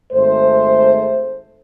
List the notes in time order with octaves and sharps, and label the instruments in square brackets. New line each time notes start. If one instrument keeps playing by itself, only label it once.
[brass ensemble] G#1 A3 C5